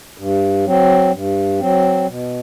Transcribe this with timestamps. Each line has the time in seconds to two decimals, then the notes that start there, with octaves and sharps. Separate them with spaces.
0.18 G2
0.65 F#3 C4
1.13 G2
1.59 F#3 C4
2.07 B2